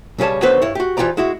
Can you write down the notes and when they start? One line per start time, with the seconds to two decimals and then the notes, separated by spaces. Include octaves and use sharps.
0.18 B1 C#3 G3 C#5 A5
0.42 D3 D#3 F#3 B3 B4 C5
0.62 G2 E4 C#5
0.75 F#4 G4
0.97 F2 E3 F4 G4 D5 A#5
1.17 G#3 E4 F#4